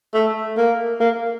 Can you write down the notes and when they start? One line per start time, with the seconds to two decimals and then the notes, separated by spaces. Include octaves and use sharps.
0.14 A3
0.58 A#3
1.00 A#3